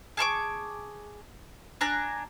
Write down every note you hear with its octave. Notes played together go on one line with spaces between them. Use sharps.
G#4 A5 C#6 D6
D4 G#5 A#5 F#6